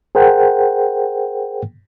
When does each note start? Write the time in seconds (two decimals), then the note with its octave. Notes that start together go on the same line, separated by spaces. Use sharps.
0.15 G#4 A#4 C5 F#5 G5